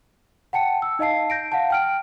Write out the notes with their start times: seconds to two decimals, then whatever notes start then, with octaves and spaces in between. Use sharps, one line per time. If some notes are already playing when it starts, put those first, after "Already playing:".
0.53 F#5 G5 A5 C#7
0.82 E6
0.99 D#4 D#5 F5 A5 C7
1.30 G6 A#6 D7
1.52 F5 F#5 A5
1.71 G5 F6 D7